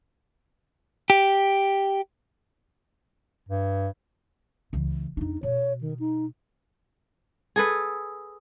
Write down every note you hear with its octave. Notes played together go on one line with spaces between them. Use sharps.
G4
G2
C#2 E3
F2 D4 D#4
B2 C#5
D#3
D#4
G#4 A4 B4